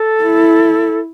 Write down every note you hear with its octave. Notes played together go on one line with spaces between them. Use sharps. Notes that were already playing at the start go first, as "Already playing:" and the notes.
Already playing: A4
E4